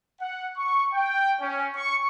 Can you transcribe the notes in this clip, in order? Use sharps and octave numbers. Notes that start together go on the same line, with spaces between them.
F#5
C#6
G5
C#4
C#6